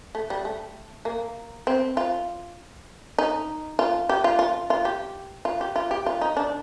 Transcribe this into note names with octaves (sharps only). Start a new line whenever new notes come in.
A3
G3
A3
A#3
C4
F4
D#4
F4
G4
F4
F4
F4
G4
F4
G4
F4
G4
F4
D#4
D4